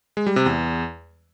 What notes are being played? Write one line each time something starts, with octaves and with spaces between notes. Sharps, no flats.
G#3
G3
C3
E2